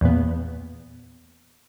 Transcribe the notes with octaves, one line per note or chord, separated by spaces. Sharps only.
E2 A#2 B3